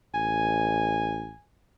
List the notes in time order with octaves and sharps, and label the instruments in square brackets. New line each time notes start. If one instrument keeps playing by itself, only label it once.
[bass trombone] A1 [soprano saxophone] G#5